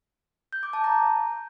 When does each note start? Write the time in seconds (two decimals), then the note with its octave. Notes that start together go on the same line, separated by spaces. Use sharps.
0.53 G6
0.63 D6
0.73 A5
0.84 A#5